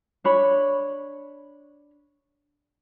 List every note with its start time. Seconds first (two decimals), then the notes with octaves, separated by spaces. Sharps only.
0.24 D4 C#5 B5